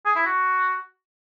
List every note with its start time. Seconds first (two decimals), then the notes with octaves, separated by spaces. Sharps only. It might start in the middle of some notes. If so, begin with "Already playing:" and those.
0.05 G#4
0.16 E4
0.26 F#4